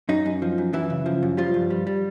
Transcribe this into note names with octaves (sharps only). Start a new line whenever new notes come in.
F#2 D#4
F#2
F3
F#2
F#2 E3 E4
C#3
F3
F#2
F3 G3 F4
G2
G3
G3